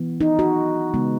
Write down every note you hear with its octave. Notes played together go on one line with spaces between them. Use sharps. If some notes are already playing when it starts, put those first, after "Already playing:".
Already playing: E3 B3
D#4
F#4
C#3 G#3 B3